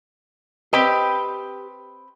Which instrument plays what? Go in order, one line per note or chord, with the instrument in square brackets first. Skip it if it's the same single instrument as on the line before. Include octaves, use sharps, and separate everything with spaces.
[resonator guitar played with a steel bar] C4 B4 D#5 [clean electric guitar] G4 G5